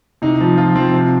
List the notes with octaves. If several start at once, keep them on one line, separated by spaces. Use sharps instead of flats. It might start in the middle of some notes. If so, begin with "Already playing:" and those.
C3 D#4
F3
F3 F4
F3 C4
C3